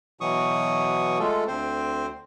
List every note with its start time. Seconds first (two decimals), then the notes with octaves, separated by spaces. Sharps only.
0.21 B2 E3 F#3 C#6 D#6
1.19 G#3 A3 F4 A4
1.48 D2 C4 C5